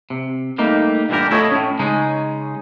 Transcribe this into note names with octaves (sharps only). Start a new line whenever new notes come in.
C3
G3 A3 A#3 D#4
G2 A#2 D3 E3 G4 A#4
A3 E4 F4 A4 C#5 D#5
A2 C#4
C#3 G#3 C#4 D#4